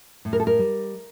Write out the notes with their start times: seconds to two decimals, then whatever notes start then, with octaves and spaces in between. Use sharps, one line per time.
0.25 A2
0.33 A#4
0.40 A4
0.47 A#4
0.59 G3